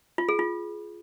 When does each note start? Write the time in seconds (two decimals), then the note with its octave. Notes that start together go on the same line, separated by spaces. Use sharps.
0.18 F4
0.29 G#4
0.39 F4